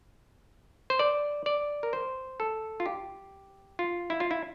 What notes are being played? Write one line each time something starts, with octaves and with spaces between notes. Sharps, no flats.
C5
D5
D5
A#4
C5
A4
F4
G4
F4
E4
F4
E4